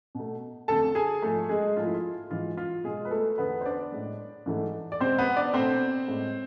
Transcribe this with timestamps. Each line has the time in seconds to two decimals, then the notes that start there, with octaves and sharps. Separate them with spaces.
0.15 B2 A3
0.68 F2 D3 A3 A4 A5
0.95 G#4 G#5
1.22 G#2 F3 A3 A4
1.49 G#3 G#4
1.76 G#2 F3 A3 F4
1.85 E4
1.95 F4
2.31 G#2 E3 G#3 F4
2.57 F4
2.84 B2 G#3 G#4
3.05 B4
3.11 A3 A4
3.38 E2 D3 A3 B3 B4
3.61 C5
3.66 D4 D5
3.92 A2 G#3
4.46 G#2 E3 A3
4.92 D5
5.00 E2 B2 G#3 C4 C5
5.18 B3 B4
5.36 D4 D5
5.54 B2 A3 C4 C5
6.08 A2 G#3